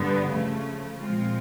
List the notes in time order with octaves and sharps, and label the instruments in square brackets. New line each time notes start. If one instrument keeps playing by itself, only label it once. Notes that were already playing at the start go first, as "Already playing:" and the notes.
Already playing: [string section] G2 D3 G3 B3
C#3 F3 A3
A#2 F3 G#3 C4 F4